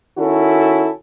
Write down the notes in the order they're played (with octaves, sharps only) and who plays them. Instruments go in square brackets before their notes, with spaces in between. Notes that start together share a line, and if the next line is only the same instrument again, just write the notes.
[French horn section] D#3 C#4 E4 F#4 A4